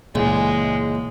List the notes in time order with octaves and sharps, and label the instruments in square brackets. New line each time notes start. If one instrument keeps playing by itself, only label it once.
[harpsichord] C#2 [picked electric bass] A#2 E3 [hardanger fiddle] G#3